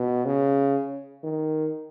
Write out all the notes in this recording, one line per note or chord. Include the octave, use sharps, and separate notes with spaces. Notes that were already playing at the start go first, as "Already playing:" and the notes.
Already playing: B2
C#3
D#3